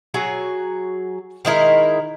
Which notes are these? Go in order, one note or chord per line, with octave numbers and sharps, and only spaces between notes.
F#3 F#4 G#4
D#3 G#3 E4 A#4